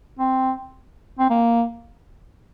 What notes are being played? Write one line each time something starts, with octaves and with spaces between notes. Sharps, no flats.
C4
C4
A#3